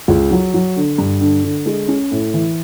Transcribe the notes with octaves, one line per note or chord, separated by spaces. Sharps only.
C#2
F#3
F#3
D3
G2
D3
D3
G#3
C#4
A2
E3